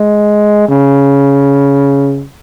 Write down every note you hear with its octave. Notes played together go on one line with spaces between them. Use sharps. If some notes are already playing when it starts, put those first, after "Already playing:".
Already playing: G#3
C#3